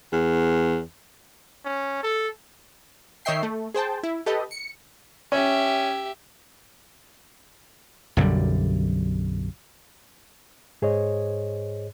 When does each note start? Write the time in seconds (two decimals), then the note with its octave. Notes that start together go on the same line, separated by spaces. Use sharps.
0.13 E2
1.65 C#4
2.03 A4
3.25 D#3 C#5 D#5 E5 G5 C7
3.43 A3
3.74 G#4 C5 G5 A5
4.03 E4
4.26 G4 A4 B4 D#5
4.51 C#7
5.32 C#4 G4 E5
8.17 B1 F#2 D3 G3
10.82 G#2 G#4 C5 C#5 D#5